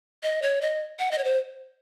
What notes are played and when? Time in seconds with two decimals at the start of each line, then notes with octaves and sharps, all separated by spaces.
0.23 D#5
0.42 C#5
0.61 D#5
0.99 F#5
1.11 D#5
1.18 C#5
1.24 C5